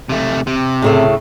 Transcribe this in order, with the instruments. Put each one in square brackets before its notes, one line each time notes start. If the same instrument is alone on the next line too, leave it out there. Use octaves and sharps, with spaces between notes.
[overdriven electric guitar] C3 A3
C3
[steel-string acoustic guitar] A2 C#3 A3